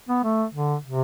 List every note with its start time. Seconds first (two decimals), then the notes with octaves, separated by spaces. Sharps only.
0.09 B3
0.24 A3
0.54 D3
0.85 C3